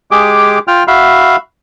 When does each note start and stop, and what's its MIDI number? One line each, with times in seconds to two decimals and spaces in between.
0.11 0.59 56
0.11 0.59 67
0.11 0.59 68
0.11 0.59 86
0.68 0.83 65
0.68 0.83 79
0.68 0.83 89
0.88 1.36 66
0.88 1.36 76
0.88 1.36 77
0.88 1.36 83